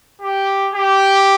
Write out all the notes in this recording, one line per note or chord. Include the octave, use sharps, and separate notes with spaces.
G4
G4